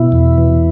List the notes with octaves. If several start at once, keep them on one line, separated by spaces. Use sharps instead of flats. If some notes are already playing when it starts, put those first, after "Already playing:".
Already playing: B2 E4
E2
E3